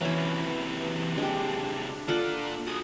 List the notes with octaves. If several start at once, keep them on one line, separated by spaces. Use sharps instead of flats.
C3 E3 F#3 C#4 E4
G#3 D4 G4
A#2 F4 A4 D5 F#5
F#4 G#4 D#6